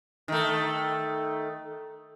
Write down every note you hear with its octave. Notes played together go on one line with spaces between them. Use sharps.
D#3 A3